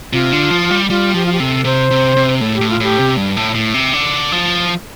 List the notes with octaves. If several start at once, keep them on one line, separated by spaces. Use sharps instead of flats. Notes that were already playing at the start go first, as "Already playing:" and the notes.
C3 F4
D3
F3
G3
G3 F4
F3 G4
F4
G4
C3 A4
C3 C5
C3
C3
A2 A4
G4
A2
F4
A2 G4
C3
G2
A2
A2
C3
D3
F3